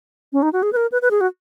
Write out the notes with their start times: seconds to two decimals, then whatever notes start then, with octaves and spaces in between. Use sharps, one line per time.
0.33 C#4
0.43 D#4
0.53 F#4
0.63 G#4
0.73 B4
0.77 A#4
0.92 B4
1.02 B4
1.11 G#4
1.21 F#4